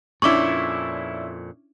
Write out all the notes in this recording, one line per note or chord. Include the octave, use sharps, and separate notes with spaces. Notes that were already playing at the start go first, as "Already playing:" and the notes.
F2 A#2 C#4 D4 E4 C#6 D6